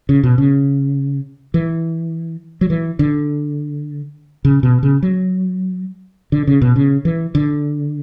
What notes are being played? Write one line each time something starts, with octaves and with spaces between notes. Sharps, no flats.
C#3
B2
C#3
E3
F#3
E3
D3
C#3
B2
C#3
F#3
D3
C#3
B2
C#3
E3
D3